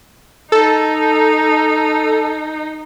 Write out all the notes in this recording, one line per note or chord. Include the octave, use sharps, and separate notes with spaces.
D#4 A4